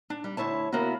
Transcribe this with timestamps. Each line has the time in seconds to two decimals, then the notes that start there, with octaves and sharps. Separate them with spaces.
0.10 D4
0.24 G3
0.37 D2 E4 C#5 A5
0.72 C#3 A#3 B3 E4 F#4